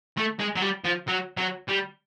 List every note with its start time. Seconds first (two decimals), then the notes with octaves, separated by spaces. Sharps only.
0.17 A3
0.39 G#3
0.56 F#3
0.62 G3
0.84 F3
1.08 F#3
1.37 F#3
1.68 G3